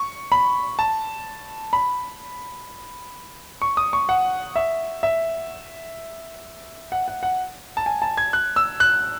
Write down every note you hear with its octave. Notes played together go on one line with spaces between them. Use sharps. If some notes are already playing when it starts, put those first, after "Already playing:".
Already playing: C#6
B5
A5
B5
C#6
D#6
C#6
F#5
E5
E5
F#5
F#5
F#5
A5
G#5
A5
G#6
F#6
E6
F#6